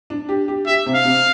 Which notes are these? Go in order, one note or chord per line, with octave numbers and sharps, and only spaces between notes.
D4
G4
G4
G4 E5
C3
F5
C3